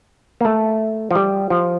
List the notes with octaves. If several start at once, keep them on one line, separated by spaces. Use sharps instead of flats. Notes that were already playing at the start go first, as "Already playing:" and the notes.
A#3
A3
F3
G3
F3